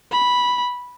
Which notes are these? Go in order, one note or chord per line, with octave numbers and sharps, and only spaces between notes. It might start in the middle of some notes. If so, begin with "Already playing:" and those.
B5